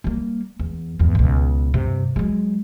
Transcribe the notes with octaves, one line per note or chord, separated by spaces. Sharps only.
G3 A#3
E2
G1 E2
C#2 B2
G2 C3
F#3 G#3